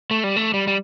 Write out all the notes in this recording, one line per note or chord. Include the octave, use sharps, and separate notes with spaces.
A3
G3
A3
G3
G3